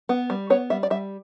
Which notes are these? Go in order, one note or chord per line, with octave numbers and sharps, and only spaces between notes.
B3
G3
B3 C#5
G3 E5
D5
G3 E5